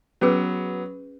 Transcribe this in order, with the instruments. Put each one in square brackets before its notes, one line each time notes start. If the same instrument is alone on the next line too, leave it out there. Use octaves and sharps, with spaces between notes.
[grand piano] F#3 B3 [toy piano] C#4 G#4 B4